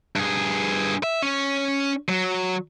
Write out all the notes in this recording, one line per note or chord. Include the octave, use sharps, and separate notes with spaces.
G2 G#4
E5
C#4
F#3